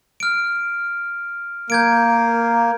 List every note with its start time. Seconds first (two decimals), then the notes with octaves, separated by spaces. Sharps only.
0.20 F6 D7
1.70 A#3 G6 G#6 D7